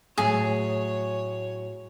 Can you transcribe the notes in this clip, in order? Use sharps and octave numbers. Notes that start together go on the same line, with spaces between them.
A2 F#3 G#4 C#5